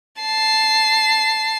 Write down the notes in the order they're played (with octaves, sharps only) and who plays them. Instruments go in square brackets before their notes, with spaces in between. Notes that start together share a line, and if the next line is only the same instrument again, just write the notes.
[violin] A5 C7